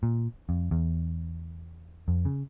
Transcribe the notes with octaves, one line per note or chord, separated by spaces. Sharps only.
A#2
F2
E2
F2
C#3